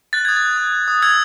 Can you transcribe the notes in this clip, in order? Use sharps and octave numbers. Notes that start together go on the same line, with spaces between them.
F#6 A6
D#6 G#6
A6
F#6
D#6
F#6
D#6
E6 G#6